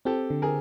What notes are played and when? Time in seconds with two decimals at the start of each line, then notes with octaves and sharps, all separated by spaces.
0.05 C4 G4 A4
0.30 D3
0.42 G#4 A#4